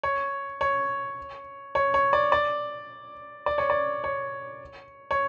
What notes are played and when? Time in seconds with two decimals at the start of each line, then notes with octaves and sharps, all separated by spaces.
0.03 C#5
0.61 C#5
1.75 C#5
1.94 C#5
2.13 D5
2.32 D5
3.46 D5
3.58 C#5
3.70 D5
4.04 C#5
5.11 C#5